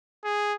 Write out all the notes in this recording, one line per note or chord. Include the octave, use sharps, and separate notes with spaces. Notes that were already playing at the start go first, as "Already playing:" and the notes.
G#4